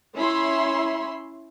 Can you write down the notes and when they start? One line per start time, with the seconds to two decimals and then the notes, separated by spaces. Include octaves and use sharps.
0.16 C#4 E4 C#5 E5 B5 C6